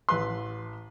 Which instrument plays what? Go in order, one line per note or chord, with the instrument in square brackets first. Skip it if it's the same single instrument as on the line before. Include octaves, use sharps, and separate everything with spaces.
[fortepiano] A1 B4 C6